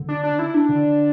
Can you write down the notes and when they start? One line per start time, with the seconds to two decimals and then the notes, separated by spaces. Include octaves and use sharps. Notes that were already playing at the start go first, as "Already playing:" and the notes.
Already playing: D3
0.09 D4
0.23 D4
0.39 E4
0.54 D4
0.69 D3